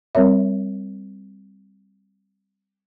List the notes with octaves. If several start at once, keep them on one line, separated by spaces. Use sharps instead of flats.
G3 C4 A#4 C#5 E5